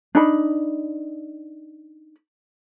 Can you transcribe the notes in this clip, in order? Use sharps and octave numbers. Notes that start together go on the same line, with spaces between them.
D4 D#4 B5